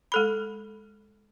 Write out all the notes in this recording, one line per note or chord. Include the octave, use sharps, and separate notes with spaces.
G#3 A4 B5